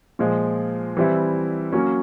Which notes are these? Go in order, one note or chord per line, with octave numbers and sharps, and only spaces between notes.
A#2 F3 G#3
E3 G3 C4 E4
F#3 A#3 C#4